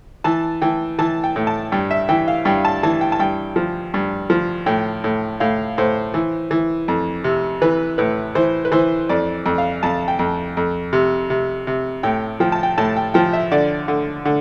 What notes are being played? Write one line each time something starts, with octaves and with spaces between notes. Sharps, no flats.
E3 A5
E3 G5
E3 A5
G5
A2
A5
G2 G5
E5
E3 G5
F5
G2 G5
A5
E3 A5
G5
A5
G2 G5
F3
G2
F3
A2 G5
A2
A2 F5
A2 C5
E3
E3
F2
C3
E3 B4
A2 B4
E3 C5
B4
E3 C5
F2 D5
F2
F5
F2 A5
G5
F2
F2
C3
C3
C3
A2 G5
F3 G5
A5
G5
A2 A5
G5
F3 G5
E5
D3 D5
D3
D3